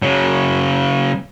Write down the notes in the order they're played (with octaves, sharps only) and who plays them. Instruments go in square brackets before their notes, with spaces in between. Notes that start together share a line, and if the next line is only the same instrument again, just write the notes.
[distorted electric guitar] C#3 F#3